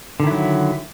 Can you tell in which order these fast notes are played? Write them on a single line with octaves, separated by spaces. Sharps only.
D3 D#3 E4 F#3